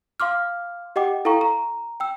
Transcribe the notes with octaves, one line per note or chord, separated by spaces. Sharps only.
F5 C6 D6 F6
G4 D#5 F#5 G5 D6
E4 A4 F5 G5 A#5 C#6
A#5
G5 E6